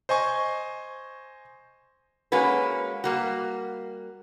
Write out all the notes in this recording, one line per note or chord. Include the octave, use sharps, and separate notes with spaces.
C5 D#5 G#5 C#6
G#3 A#3 C#4 F#4 B4
G3 A#3 F#4